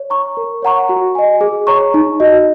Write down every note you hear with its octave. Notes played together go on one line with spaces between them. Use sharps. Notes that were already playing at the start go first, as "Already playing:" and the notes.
Already playing: C#5
A#5 C#6
A#4
C#5 F#5 A#5 C#6
F#4
D#5 G#5
G#4
C#5 A#5 C#6
D#4
F#4 D#5